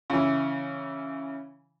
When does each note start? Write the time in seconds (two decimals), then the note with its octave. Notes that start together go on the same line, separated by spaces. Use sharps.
0.10 C#3 E3